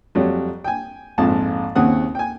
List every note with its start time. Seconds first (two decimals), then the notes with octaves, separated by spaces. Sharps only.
0.15 F2 F#3 G3
0.64 G5 G#5
1.18 A#1 F2 G#2 A5
1.75 D#2 C#3 C4 F#5 D#6
2.15 G5 G#5